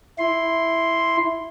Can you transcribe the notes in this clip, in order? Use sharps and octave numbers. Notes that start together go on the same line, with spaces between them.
E4 C6